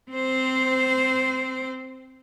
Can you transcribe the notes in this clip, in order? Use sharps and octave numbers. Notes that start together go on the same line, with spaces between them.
C4 C5